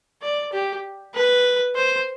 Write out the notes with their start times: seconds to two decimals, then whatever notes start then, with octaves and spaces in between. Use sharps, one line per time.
0.22 D5
0.52 G4
1.14 B4
1.75 C5